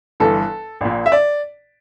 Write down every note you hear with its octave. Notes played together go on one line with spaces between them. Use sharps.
G1 G2 E3 A4
A#1 A#2
E5
D5